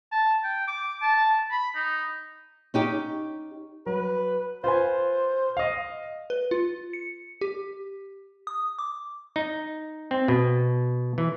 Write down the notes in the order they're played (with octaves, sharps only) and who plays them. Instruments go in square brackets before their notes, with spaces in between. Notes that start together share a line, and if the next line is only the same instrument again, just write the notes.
[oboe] A5
G5
D6
A5
B5
D#4
[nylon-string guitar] C#4 D#4 G4
[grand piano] F#3 [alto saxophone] B4
[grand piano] F4 B4 G#5 [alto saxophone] C5
[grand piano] D#5 F5
[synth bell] B4
F4
C#7
G4
D#6
D6
[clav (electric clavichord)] D#4
C4
B2
E3